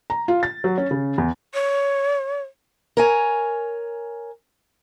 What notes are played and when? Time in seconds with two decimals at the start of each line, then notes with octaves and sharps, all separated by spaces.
0.10 A#5
0.28 F4
0.43 A6
0.64 F#3
0.78 C#4
0.91 C#3
1.18 E2
1.54 C#5
2.97 A#4 C#5 G#5